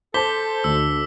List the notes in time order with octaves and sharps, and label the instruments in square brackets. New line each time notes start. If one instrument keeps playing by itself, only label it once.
[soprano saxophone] A4 [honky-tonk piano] C5 A5 [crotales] D6 B6 G7
[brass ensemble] D2 [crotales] E6